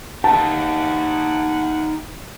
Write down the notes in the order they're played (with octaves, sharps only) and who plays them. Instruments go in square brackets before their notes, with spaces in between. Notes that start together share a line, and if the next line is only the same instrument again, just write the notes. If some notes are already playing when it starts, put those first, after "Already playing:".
[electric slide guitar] D#4 G4 [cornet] F#5 [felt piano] A5